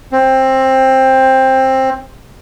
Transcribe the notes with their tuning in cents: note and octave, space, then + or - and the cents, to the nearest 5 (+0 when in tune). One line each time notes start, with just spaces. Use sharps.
C4 +15